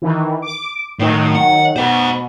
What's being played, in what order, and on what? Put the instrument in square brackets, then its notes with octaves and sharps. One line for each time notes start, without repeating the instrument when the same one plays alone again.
[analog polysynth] D#3 E3
D6
[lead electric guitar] A2 [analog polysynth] D#3 F#3
[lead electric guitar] F#5
[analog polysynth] B2 [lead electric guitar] C5 F#5